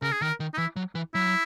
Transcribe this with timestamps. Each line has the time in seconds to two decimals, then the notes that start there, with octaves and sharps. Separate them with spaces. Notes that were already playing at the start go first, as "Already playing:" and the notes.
0.02 C#3 A#4
0.12 G#4
0.21 D#3 A#4
0.40 D#3
0.54 D#4
0.58 E3 E4
0.76 F#3
0.95 E3
1.14 F#3 E4